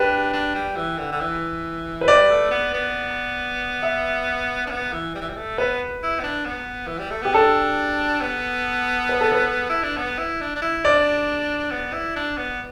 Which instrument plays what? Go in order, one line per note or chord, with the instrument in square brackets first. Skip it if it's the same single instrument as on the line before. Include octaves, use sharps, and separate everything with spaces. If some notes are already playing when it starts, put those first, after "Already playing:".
Already playing: [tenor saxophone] D4 [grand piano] G4 B4
[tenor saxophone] D4
G3
E3
D3
D3
E3
[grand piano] B4
[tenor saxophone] G3 [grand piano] D5
[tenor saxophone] A3
B3
B3
[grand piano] E5
[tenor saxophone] D4
B3
E3
G3
E3
G3
A3
[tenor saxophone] B3 [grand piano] B4
[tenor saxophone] E4
B3
D4
B3
E3
G3
A3
[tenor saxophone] B3 [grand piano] G4
[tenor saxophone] D4 [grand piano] A4
[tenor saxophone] B3
[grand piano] B4
A4
B4
[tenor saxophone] E4
D4
B3
E4
D4
D4
E4
[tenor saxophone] D4 [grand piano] D5
[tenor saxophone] B3
E4
D4
B3